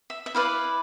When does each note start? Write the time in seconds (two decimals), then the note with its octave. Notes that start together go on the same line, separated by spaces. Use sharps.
0.10 E5
0.26 E5
0.35 E4 B4 D5 F5